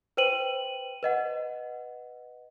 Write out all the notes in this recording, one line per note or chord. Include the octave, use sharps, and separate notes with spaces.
B4 C5 G5 D#7 F#7
B4 D#5 F#5